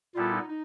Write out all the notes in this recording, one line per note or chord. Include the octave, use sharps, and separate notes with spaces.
A#2 G3 B3 E4 F4 A4
D#4
D#4